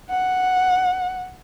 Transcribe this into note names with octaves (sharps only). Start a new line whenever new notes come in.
F#5